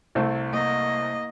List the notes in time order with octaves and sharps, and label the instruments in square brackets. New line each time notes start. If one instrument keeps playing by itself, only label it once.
[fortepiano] C2 A3 C4
[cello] A#3 D#5